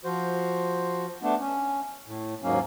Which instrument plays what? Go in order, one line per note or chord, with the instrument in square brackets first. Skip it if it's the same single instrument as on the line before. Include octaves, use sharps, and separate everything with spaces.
[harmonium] F3 F#4 C5
A3 B3 D4
C#4
A2
D#2 G#2 F#3 A#3 C#4